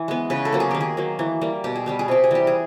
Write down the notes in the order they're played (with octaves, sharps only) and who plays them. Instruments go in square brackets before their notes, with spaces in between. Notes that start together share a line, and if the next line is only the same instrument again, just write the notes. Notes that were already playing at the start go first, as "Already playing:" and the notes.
Already playing: [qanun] E3
G#3 B3
C#3 B4
A4
F#3 A#3
G#4
D#3 G4
G#4
F#3 A#3
E3
G3 A#3
B2 G4
G#4
G3 B3 G4
G#4
C3 G4
G#4
E3 G3 G4
G#4